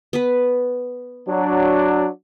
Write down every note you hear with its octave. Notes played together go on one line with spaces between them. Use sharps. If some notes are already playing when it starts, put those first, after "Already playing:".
B3 B4
F#3 D4